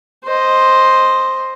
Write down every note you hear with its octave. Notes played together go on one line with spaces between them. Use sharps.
C5 D#5